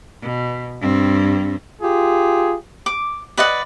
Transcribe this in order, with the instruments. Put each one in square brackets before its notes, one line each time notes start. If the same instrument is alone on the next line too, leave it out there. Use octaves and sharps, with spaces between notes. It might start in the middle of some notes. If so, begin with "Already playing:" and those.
[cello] B2
G2 C4
[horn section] F4 G4 G#4
[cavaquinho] D6
B4 D5 D#5 F#5